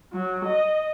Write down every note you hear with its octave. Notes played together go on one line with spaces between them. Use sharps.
F#3
D#5